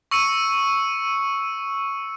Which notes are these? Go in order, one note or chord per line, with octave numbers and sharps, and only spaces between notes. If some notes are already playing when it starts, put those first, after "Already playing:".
C#6 E6 C#7 D#7